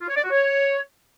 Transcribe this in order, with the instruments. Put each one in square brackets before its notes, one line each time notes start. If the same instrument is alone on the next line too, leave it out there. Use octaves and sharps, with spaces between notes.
[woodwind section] F4
C#5
D5
F#4
C#5